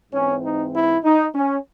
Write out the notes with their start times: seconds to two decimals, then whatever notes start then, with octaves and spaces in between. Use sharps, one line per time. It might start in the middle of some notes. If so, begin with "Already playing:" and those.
0.12 G#2 E3 C4 C#4
0.43 D#4
0.74 E4
1.04 D#4
1.35 C#4